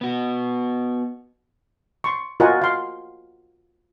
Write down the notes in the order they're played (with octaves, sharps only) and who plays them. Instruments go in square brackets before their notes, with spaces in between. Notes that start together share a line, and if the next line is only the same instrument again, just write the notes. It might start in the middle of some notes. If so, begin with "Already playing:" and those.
[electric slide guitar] B3 F#4
[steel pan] C6 C#6
F4 F#4 A#4 D#5 F#5 G#5
F5 C6